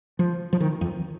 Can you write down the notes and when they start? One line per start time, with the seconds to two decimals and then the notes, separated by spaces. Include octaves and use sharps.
0.19 F3
0.53 F3
0.60 D#3
0.81 F2